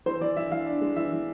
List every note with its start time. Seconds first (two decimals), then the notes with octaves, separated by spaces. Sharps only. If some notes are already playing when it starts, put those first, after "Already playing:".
0.06 E3 C5
0.21 E3 D5
0.36 E3 E5
0.51 E3 F5
0.67 D4
0.81 G#3
0.96 E3 E5
1.12 E3